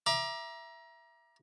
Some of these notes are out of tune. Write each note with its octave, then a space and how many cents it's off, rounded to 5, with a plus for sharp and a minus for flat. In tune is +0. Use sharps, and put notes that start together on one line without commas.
E5 +10 A#5 +30 D6 +15